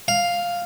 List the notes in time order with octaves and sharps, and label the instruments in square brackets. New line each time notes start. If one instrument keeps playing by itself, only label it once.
[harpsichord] F5